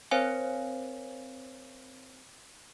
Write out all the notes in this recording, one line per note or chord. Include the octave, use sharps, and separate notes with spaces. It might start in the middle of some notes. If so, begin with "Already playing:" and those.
C4 A#4 C5 C#5 F5 G#5